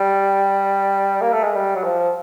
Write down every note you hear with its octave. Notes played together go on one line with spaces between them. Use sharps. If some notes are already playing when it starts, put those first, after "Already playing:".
Already playing: G3
A#3
A3
G#3
G3
F#3
F3